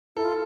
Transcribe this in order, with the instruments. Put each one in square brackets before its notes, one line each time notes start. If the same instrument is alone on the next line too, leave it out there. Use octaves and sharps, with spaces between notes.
[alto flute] E4 [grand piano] A4
[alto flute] F4